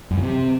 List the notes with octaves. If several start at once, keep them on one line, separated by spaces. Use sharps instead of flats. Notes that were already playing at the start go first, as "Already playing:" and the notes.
F#2
E3
C3